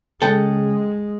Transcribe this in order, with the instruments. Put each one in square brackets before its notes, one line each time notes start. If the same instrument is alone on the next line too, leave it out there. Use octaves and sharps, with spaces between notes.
[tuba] C#3 [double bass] G#3 [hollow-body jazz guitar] A4 F#5 G5